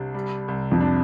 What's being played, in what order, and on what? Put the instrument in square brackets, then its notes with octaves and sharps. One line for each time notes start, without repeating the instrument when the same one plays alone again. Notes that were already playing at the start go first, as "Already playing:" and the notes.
Already playing: [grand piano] C2 C3 D4
G3
C2
[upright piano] F2
[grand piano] D4